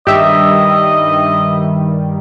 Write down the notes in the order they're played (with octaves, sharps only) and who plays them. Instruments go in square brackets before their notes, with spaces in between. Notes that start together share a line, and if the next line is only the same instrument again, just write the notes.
[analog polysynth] G2 D#3 G3 [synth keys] G4 E5 [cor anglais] D#5